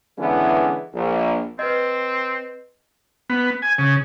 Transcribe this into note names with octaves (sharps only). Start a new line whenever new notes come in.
D3 E3 G#3 B3 C#4 E4
A#1
C4 B4 D#5
B3
G#5
C#3